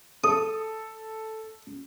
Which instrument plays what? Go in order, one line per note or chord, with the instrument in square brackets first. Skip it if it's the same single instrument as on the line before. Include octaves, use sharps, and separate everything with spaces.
[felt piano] A4 [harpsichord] D#6